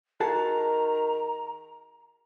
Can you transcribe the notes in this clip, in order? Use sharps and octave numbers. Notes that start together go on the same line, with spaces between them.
D#3 F#4 G#4 A5 A#5